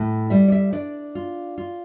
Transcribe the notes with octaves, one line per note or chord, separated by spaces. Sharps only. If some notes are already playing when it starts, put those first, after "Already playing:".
Already playing: A2
G3 E5
D5
E5
D4 D5
F4
F4